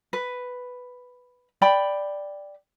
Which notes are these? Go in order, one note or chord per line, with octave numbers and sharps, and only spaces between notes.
B4
D5 G5 B5